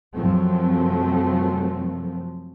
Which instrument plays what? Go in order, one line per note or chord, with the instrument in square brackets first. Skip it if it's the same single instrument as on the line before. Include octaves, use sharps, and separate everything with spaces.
[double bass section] F#2 C3 F3 F#3 A3 C4